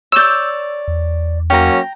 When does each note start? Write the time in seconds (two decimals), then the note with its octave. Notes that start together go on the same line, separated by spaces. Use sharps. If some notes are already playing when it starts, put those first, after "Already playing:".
0.12 C#5 D5 E6 G6
0.88 E2
1.50 F#3 A#3 C#4 G5 A#5